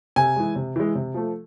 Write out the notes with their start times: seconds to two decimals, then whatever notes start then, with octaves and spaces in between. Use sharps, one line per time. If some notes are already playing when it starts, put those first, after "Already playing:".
0.16 C3 G#5
0.36 E3 G#3
0.56 C3
0.76 E3 G#3
0.95 C3
1.14 F3 A3